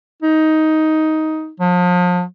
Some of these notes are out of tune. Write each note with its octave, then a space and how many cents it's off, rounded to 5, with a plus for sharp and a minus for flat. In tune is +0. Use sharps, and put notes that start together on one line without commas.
D#4 +10
F3 +35